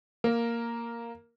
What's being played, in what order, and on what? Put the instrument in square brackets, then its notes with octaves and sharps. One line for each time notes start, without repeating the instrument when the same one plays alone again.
[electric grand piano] A#3 A#4